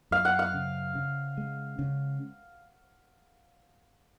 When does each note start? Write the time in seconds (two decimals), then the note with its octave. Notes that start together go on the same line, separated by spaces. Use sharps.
0.11 F#2 F5
0.25 F#5
0.39 F5
0.54 C#3
0.95 C#3
1.37 G#3
1.79 C#3